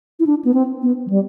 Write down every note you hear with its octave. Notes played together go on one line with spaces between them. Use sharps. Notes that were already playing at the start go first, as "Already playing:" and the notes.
E4
D4
B3
C4
B3
F#3
G3